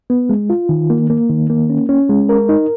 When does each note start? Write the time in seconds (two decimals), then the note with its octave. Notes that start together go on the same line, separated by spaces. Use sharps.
0.10 B3
0.29 G#3
0.50 F4
0.69 D#3
0.90 A#3
1.10 A#3
1.30 D#3
1.50 A#3
1.70 C#4
1.89 C#4
2.09 G#3
2.29 A#4
2.49 D#4